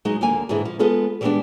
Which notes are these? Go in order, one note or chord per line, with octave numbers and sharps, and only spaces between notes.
F#3 G#3 D#4 D#5
D#2 D3 A#3 G#5
G#2 D3 E3 G#3 E4
F3
G#3 B3 F4 G#4 A4
E3 G3 G#3 A#3 B3 D4